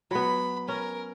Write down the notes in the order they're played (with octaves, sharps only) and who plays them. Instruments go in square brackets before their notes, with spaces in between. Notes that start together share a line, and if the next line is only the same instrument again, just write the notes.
[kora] F#3 B3 [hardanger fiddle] B5
[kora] C#4 [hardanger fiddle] A#4